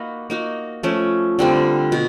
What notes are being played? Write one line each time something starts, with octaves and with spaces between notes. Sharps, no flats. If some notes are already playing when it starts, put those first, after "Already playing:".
Already playing: A#3 D#4 F#4 B4
A#3 D#4 F#4
F3 A3 C#4
D3 G3 C4 F4
B2